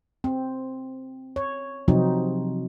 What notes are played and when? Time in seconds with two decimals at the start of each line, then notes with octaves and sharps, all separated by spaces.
0.24 C4
1.36 C#5
1.88 C3 F3 F#3 C4 D#4